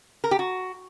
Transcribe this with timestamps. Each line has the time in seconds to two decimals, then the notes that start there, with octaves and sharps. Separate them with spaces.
0.24 A#4
0.31 G4
0.39 F#4